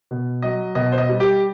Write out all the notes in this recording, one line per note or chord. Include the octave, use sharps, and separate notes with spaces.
B2
F#3 D#5
B2 D#5
C5
D#5
G3
G4